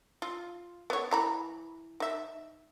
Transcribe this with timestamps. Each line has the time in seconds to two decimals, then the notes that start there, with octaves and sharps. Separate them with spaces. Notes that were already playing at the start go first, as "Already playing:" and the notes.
0.22 F4
0.90 B3 C#5
1.11 E3 A#5 B5
2.00 D#4 E5